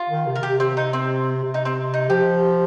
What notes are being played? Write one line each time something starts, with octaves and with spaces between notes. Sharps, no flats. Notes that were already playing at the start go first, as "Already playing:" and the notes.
Already playing: F4
D#3
C3
A#4
C3 G4
C4
D#4
C4
C3
D#4
C4
D#4
F3 G4